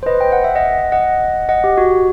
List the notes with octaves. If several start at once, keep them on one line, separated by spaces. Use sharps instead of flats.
C5
B4 D#5
G5
F#5
E5
D#5 F#5
D#5 F#5
D#5 F#5
G4
F#4